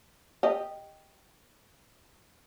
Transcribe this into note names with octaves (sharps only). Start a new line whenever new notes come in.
G4 D#5